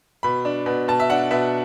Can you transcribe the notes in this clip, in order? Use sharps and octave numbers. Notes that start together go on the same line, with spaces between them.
B2 B5
D4
B2
B2 A5
E5
D4 F#5
B2 E5